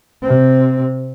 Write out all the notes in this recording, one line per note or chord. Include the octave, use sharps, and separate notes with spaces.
C3 C4